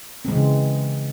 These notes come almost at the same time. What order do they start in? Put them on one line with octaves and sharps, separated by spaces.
C4 G#3 E3 C#3